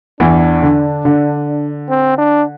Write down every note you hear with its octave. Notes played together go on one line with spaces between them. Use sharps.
E2 E3 D4
D3
D3
C4
D4